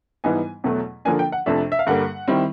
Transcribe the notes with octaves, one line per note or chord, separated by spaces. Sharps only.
G#2 E3 G3 B3 D#4 G#5
E2 B2 F#3 A3
D3 F3 A#3 D4 G#5
G5
F#5
F2 C3 F3 A3 D4 E5
E5
F5
G2 D3 G3 A#3 F#5
D#3 G3 C4 E4